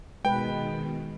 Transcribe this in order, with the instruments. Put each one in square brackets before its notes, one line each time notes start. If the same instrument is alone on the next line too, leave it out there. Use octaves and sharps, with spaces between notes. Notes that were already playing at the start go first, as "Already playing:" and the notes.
[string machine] B2 D#3 [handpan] G#3 B4 [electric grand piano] G5